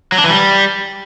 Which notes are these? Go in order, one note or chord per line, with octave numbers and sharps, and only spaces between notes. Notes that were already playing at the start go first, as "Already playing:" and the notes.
F#3
D4
E3
G3